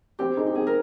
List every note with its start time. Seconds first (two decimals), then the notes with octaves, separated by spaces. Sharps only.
0.19 C4 G4
0.37 D#4 G#4
0.47 G4
0.55 C4 G#4
0.67 A#4